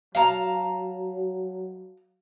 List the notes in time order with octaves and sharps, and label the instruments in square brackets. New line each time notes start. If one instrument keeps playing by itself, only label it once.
[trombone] F#3 [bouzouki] F5 A5 A#5